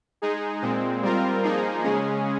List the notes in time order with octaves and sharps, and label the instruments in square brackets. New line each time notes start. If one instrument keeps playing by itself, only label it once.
[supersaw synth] G#3 D#4 G#4
A#2 G#3 C4
G3 C4 F4 A#4
F3 A#3 D#4 G#4
C#3 G#3 C#4 G#4